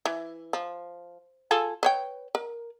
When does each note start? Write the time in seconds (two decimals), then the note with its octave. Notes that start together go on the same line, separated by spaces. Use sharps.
0.05 E3
0.53 F3
1.51 F4 G#4 A4
1.83 B4 C#5 G5
2.35 A#4